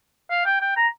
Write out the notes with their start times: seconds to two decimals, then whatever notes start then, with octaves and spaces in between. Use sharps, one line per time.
0.30 F5
0.46 G5
0.61 G5
0.76 A#5